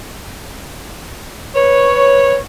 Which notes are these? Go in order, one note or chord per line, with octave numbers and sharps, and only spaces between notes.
B4 C#5